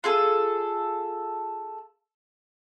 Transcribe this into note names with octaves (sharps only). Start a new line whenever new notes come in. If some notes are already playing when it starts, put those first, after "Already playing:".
F4 G#4 A4